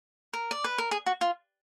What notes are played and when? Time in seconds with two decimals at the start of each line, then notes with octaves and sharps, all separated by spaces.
0.33 A#4
0.51 D5
0.64 B4
0.78 A#4
0.91 G#4
1.06 F#4
1.21 F4